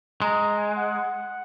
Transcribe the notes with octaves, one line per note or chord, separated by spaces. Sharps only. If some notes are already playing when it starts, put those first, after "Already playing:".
G#3 A#5
A#5
G#5
F#5